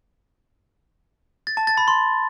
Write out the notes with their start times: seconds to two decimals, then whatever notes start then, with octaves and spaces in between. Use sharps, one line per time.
1.47 A6
1.57 A5
1.67 A6
1.77 B5
1.88 C6